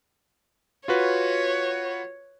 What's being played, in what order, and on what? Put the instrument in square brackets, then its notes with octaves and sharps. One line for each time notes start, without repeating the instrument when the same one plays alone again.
[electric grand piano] F4 F#4 B4 [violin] C#5